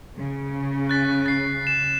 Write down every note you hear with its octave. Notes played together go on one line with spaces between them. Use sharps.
C#3
F#6 A6 B6
A6 C7
E7